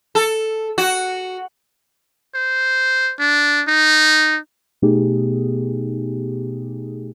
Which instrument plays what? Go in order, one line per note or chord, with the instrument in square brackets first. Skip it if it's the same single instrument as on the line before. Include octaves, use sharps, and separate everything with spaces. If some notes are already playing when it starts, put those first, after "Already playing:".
[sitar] A4
F#4
[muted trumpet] C5
D4
D#4
[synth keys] B2 A3 B3 D#4 G4 G#4